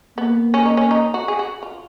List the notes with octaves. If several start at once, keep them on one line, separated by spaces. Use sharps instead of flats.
A#3 B3
C#4
D#4
C#4
D#4
F#4
G#4
F#4
F4